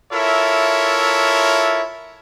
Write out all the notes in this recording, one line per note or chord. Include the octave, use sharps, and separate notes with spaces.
E4 F4 A4 A#4 C#5 E5